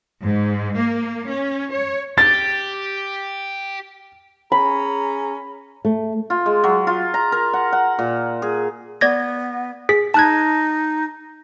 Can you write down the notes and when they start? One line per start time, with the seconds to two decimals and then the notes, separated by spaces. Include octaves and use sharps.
0.23 G#2
0.78 A#3
1.28 C#4
1.72 C#5
2.18 G4 A6
4.52 C#4 G#4 A#5 B5
5.85 A3
6.30 F4
6.46 G#3
6.64 F#3
6.87 F4
7.14 A#5
7.32 A#4
7.53 F#5
7.73 F#5
7.99 A#2
8.42 G#4
9.01 B3 D5 G#6 A#6
9.89 G#4 B6
10.14 D#4 A5 F#6 G#6